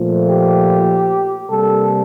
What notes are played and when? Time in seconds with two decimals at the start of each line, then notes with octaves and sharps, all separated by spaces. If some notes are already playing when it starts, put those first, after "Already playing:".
Already playing: A#2 F3 A3
0.29 G4
1.50 C3 G3 A#3 A4